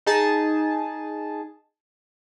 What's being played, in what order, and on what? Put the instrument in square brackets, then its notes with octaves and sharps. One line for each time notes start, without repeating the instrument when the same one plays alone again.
[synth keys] D#4 G#4 A5